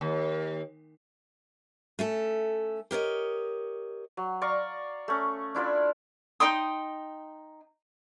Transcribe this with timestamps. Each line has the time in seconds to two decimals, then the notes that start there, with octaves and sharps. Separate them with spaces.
0.01 D#2
1.99 A3 C#4 A4
2.91 G4 A#4 C#5 D#5
4.17 F#3
4.42 D5 F5 A#5 C#6
5.08 A3 C#4
5.55 D4 E4 F4 D5
6.40 D#4 G5 C6 D#6